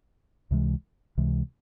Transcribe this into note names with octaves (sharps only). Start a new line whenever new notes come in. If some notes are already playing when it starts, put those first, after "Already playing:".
C#2 C3 E3 G#3
C#2 C3 E3 G#3